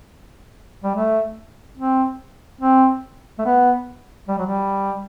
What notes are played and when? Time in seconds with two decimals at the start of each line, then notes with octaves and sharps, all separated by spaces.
0.84 G3
0.95 A3
1.77 C4
2.61 C4
3.39 A3
3.45 B3
4.28 G3
4.38 F#3
4.47 G3